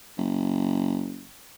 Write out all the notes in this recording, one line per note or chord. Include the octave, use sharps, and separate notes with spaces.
F#1